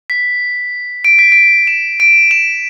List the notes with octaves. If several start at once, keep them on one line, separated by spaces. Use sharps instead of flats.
B6
D7
B6
D7
E7
D7
E7